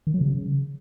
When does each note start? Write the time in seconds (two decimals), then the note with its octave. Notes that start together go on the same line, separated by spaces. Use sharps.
0.07 D#3
0.14 F#3
0.21 C#3